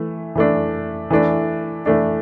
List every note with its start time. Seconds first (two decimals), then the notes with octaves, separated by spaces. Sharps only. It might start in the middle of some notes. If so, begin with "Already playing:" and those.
Already playing: E3 A3
0.35 E3 A3 D4
1.11 E3 A3 D4
1.86 E3 A3 D4